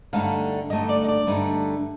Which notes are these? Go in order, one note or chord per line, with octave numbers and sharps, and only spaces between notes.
G2 D3 A3 D#4 F5
G2 D3 A3 D#4 D#5
D5
D#5
D5
G2 D3 A3 D#4